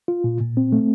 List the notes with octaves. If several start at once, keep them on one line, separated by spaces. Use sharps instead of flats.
F4
A#2
A#2
C4
A3